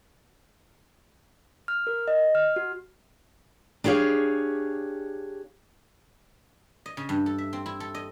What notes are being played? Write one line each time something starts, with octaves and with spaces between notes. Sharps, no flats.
F6
A#4
D#5
F6
F#4
D4 G4 G#4 C#5 F5
D#5
C#3
G2
A4
E5
C4
E4
A4
D#5